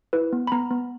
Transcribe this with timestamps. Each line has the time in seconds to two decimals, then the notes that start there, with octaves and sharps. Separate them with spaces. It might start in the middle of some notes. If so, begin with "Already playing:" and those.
0.13 E4 B4
0.33 B3
0.47 B5
0.52 B3 A#5
0.71 B3